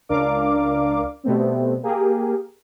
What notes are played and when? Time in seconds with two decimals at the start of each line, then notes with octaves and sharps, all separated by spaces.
0.09 C#2 D4 A#4 D5 F5 D6
1.24 B2 G3 A3 B3 C4
1.83 A#3 G4 G#4 A#4